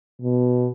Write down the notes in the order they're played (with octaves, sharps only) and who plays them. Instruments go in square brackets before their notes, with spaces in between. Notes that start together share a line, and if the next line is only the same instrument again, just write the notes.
[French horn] B2